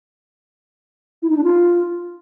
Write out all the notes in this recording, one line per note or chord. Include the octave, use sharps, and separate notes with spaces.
E4
D#4
D4
F4